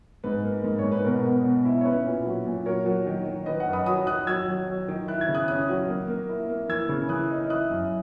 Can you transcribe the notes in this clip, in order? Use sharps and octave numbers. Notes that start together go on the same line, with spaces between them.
G#2 B4
A#3
G#2
C#5
G#2
B4
B2 A#4
B3
B2
E4
C#5
C#4 B4
A#2
F#3
A#2
F#3 A#4 C#5
F#3
D#3
D#3
D#3 B4 D#5
D#5 F#5
F#2
B5 D#6
F#3 B5 D#6
D#3 D#6 F#6
F#3 E6 G#6
F#3
F#3
D#3
E4 F#6
G#6
C#3
D#6 F#6
C#4 D#6 F#6
F#3
A#3
A#3
E4
A#3
E3 E6 G#6
C#3
E3 D#6 F#6
D#4
E4 D#6 F#6
F#2